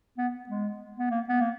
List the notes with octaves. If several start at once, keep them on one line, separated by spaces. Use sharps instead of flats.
B3
G#3
B3
A#3
B3
A#3